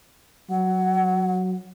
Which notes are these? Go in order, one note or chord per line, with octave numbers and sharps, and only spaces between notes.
F#3 F#5